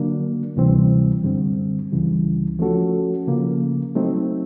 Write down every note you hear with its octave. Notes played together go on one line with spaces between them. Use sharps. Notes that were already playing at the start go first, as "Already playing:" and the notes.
Already playing: D3 F#3 A#3 D4
D2 C3 E3 G3 C4
F#2 D3 G3 C4
C#2 C#3 E3 G3
F3 A3 C#4 F#4 A4
C#3 F3 A#3
F#3 A3 C4 D#4